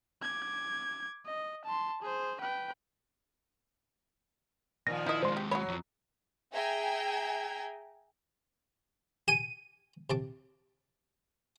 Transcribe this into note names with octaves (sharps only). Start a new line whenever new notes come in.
D6 G#6
D#5
A5 C6
G#4 C5
B4 G5
A#2 D#3 F3 A#6
D#4 E4 D#5
D#2 G#3 C5 C6
G4
F#3 F#4 C#5 B5
F2 F3
G#4 E5 G5 G#5 A#5 G#6
G4 G#5 D#7
C3 A5 D6